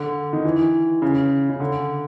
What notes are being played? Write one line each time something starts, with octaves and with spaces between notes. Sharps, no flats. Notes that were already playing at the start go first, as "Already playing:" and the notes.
Already playing: D3
D#3
E3
C#3
C#3
D3